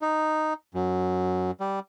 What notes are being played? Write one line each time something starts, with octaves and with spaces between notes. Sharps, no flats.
D#4
F#2
G3